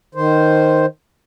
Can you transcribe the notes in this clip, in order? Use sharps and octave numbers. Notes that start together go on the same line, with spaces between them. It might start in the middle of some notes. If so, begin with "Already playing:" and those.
D#3 C5